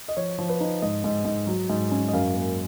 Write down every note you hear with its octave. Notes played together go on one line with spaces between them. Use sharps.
D#5
F3 C#5
F3
B4
D#4
G#2 D#5
G#2
G#2
F#3
G#2
C#4
D#5
F#2 F5
A#3